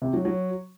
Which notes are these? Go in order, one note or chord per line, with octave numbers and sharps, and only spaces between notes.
C3
F#3
F#3